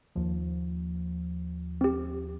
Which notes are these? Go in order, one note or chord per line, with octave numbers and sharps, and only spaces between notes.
D#2 F3
C4 G4